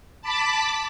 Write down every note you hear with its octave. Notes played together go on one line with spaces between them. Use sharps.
A5 B5 D6 B6